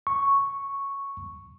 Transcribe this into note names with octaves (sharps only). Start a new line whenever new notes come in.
C#6